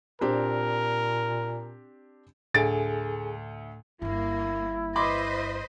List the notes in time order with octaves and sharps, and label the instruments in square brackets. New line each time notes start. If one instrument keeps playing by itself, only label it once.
[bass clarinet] A#2 [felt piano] C4 D4 G4 [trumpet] A#4
[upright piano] D2 A6 D7 [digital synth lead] A2 [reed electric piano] G#4 A4 G#5
[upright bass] G1 G2 [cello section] A#3 [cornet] E4
[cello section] B4 C5 D#5 [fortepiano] B5 C6 D6